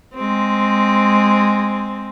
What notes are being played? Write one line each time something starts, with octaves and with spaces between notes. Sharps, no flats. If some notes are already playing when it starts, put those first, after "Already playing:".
G#3 C4